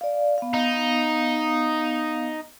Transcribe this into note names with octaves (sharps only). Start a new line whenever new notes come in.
D5 F5
B3 F5
D#4